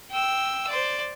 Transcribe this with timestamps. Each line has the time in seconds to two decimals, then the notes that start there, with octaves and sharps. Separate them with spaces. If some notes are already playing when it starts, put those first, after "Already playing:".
0.11 G5 E6
0.68 C5 D5